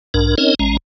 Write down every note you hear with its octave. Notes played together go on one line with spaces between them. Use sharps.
B1 G#2 D4 A#4
C4 C#4 D#4 A#4 C#5 D#5
A1 G#3 C#4 A#5